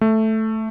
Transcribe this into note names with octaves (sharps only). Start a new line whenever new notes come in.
A3